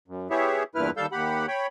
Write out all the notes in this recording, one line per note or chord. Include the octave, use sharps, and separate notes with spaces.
F#2
B3 E4 G4 G#4 C#5 E5
E2 G2 A#2 E4 B4 F6
D#2 G3 A4 F5 E6 G6
D#2 G4 F#5 B5
C#5 G5 B5